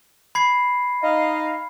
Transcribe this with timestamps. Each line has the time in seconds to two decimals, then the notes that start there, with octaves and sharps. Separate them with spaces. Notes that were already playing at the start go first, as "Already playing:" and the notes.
0.35 B5 G#6 C7
1.03 D#4 D#5 F5